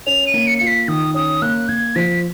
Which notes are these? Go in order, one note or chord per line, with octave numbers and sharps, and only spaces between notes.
C#4 F7
D#7
A#3
C#7
F4 C#7
B6
D#3 D#6
C#4 D#6
A#3 F#6
A#3 G#6
F3 B6